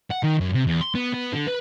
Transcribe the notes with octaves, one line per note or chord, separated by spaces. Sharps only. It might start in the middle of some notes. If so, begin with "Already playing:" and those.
F#5
D#3
F#2
C3
E2
C6
B3
B3
D3
B4